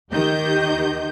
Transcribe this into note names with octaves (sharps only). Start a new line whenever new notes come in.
D#2 D#3 G4 D#5 G6